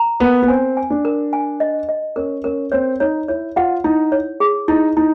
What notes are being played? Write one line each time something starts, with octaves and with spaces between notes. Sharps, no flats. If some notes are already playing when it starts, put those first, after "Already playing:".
Already playing: A#5
B3 A#4
B3
C4 G#5
G#5
D4
A#4
G#5
D#5
D#5
C#4 A#4
C#4 A#4
C4 C#5
D#4 C#5
E4 C#5
F4 F#5
D#4 E4
C#5
G#4
D#4 E4
D#4 E4